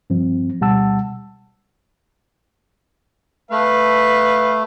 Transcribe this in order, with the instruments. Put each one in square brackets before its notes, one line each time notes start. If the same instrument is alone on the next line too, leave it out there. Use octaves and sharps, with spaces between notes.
[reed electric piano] G2 F3 C4
D2 B2 G3 F#5 A5 E6
[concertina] A3 [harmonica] B4 F5